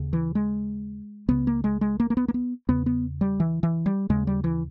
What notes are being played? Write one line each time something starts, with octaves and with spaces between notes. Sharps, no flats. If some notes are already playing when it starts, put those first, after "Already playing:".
Already playing: D#2 C#3
E3
G#3
C#2 C#3 B3
A#3
G#3
G#3
A#3
A#3
B3
A#3
B3
E2 C#3 B3
B3
G3
E3
E3
G3
D#2 C#3 G#3
G3
E3